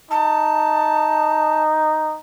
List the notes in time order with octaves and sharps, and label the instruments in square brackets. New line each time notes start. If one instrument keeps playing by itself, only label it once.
[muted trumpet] D#4 [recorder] A5